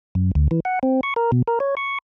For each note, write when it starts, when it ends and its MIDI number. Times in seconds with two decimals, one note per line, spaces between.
0.15 0.31 42
0.35 0.48 38
0.51 0.60 52
0.65 0.79 78
0.83 1.01 60
1.03 1.14 85
1.16 1.31 70
1.32 1.42 47
1.48 1.59 70
1.60 1.75 73
1.77 1.98 85